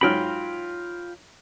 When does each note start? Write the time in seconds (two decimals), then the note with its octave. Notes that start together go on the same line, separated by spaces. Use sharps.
0.01 G#2 F#3 F4 G5 B5 F6